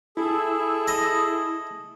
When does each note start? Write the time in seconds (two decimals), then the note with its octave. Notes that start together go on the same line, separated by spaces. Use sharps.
0.17 E4 G#4 A4
0.88 D#5